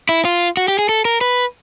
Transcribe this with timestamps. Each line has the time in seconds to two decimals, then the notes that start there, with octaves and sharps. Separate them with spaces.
0.09 E4
0.25 F4
0.57 F#4
0.68 G4
0.79 G#4
0.89 A4
1.05 A#4
1.21 B4